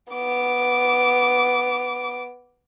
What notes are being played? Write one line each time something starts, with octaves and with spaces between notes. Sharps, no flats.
B3 D6